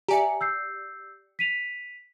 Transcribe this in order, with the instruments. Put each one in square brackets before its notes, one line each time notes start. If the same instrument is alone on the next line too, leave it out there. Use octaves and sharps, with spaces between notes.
[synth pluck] G4 D5 C#7 [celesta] E5 G#5 A#5
[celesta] E6 G6 C7
B6 D#7 F7